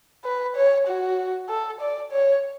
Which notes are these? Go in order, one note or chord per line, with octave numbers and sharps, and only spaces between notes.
B4
C#5
F#4
A4
D5
C#5